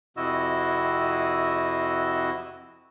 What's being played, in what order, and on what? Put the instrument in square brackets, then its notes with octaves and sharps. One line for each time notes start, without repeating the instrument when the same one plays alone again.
[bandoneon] F2 C3 E4 F#4 D#5 E6